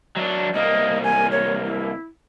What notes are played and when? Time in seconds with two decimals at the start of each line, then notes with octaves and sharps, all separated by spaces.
0.16 F#3 D4
0.54 C2 A#3 D#5
1.03 G#5
1.31 C#5
1.65 E4